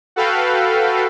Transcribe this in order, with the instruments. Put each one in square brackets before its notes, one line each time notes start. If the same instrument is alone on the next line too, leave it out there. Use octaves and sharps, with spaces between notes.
[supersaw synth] F#4 A4 B4 F5 G5